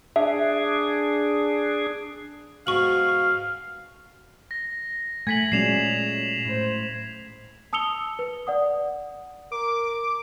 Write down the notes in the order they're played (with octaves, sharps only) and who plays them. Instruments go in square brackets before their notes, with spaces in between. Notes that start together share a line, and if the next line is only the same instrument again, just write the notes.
[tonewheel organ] D4 G#4 [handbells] E5
[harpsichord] G#2 B2 [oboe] F5 [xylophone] C#6 F#7
[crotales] A#6
[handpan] A3 [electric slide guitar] F#5 G#5 [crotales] G#6 B6 F#7
[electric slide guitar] A#2 D5 [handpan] F#3 G#3 C#4 [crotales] C7 E7 F7
[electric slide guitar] A2 C5
[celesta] A5 D#6 E6 C#7 F7 G7
B4
D5 F#5 D#6
[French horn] A#4 [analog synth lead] D6